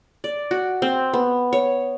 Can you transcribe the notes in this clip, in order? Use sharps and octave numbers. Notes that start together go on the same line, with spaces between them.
D5
F#4
C4
B3
C#5